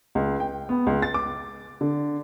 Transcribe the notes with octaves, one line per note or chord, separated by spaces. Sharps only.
C#2
G5
B3
C#2
A6
D6
D3